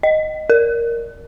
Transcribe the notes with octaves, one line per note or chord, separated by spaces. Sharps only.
D#5
A#4